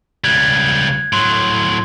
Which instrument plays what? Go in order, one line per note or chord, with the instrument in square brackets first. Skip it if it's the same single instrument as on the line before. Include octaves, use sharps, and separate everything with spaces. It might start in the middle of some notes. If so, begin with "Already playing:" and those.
[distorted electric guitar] C#2 G3 [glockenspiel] F#6 G#6
[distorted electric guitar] A2 F#3 [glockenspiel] C6